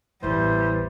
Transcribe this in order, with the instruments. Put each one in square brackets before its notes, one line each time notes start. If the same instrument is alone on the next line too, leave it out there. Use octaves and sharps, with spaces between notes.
[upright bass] A1 E2 [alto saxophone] E3 [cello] G3 [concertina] C5